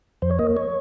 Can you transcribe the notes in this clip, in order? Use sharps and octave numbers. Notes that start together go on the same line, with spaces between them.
F2 C5
C#5
A#3 D#5
C#5